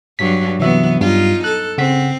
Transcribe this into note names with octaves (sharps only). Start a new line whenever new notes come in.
G2 F#3 B6
C3 E3 F#3 B3 E5
G2 G3 D#4 F4
A4 F#6
C#3 C4 F#5 B6